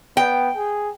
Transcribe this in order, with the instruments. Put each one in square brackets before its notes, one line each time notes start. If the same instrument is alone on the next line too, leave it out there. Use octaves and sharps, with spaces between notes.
[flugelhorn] B3 [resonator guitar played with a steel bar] G5
[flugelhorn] G#4